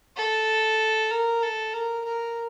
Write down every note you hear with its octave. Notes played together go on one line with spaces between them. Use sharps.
A4
A#4
A4
A#4
A#4